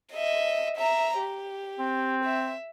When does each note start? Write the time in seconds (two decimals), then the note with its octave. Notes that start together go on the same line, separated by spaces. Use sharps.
0.13 D#5 E5
0.77 E5 A#5
1.19 G4
1.79 C4
2.25 E5